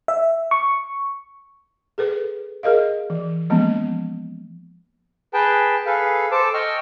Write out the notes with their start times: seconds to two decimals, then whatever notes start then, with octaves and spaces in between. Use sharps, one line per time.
0.08 E5
0.51 C#6
1.98 G#4 A4 B4
2.63 G#4 A#4 D#5 F5
3.10 E3
3.50 F3 G#3 A#3 B3 C#4
5.34 G#4 B4 G5 A5
5.86 G#4 A4 B4 F5
6.31 A4 C5 A5 D6
6.54 D#5 G5 C#6 E6 F6